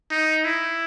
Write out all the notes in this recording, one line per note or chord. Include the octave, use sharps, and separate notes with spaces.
D#4
E4